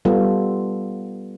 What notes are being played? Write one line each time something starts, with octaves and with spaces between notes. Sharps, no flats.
G3 B3 F4 A4